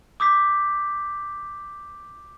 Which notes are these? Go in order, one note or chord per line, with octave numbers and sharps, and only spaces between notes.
D6 D#6 G6 B6